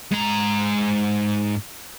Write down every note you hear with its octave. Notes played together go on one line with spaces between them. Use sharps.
G#2 A#5